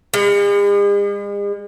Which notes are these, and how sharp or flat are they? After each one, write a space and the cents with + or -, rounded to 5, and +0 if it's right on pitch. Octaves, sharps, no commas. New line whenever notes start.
G#3 -45